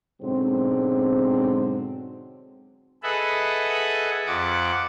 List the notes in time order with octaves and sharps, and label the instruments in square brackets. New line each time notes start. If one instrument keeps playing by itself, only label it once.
[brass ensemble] G#2 B2 D3 F#3 G#3 C4
[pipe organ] G#4 A4 B4 D#5 E5 F#5
F2 F#5 D6